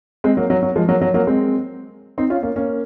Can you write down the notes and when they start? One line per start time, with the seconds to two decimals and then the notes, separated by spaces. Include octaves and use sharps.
0.24 G#3 C4
0.37 F#3 A#3
0.50 F#3
0.63 F#3
0.76 F3 G#3
0.88 F#3 A#3
1.01 F#3
1.14 F#3 A#3
1.27 G#3 C4
2.18 C4 D#4
2.30 C#4 F4
2.43 A#3 C#4
2.56 A#3 C#4